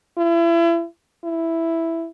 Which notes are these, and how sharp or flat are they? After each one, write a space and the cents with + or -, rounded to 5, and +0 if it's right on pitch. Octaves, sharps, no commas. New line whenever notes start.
E4 +35
E4 +0